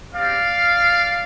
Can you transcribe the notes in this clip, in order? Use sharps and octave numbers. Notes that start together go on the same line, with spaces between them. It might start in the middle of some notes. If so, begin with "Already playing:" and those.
C4 G4 D5 F5